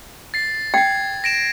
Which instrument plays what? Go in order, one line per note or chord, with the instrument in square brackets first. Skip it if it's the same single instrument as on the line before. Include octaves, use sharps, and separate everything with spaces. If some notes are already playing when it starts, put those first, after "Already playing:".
[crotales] A6 C7
[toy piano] G5 [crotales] G#6 C7
[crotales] A#6 D7 E7